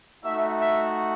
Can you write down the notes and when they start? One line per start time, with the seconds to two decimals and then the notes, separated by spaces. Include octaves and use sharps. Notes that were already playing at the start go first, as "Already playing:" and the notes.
0.23 A3 D#4 F#4 E5
0.58 E5